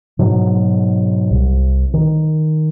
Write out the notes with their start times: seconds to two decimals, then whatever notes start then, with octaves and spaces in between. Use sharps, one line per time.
0.19 G#2 B2 F#3
1.30 C2
1.94 D#3